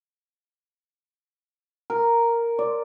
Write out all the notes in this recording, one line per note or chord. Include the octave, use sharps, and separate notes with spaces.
A#4
D5